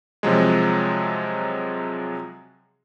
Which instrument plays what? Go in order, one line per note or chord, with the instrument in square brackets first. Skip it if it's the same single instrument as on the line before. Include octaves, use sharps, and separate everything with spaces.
[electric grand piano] C3 F3 F#3 G#3